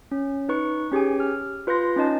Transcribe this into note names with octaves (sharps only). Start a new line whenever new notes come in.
C#4
D#4 B4 C#6
C#4 G4 G#4 G#5
F6
F4 B4 C6 G6 A#6
C#4 D#4 D#5 A5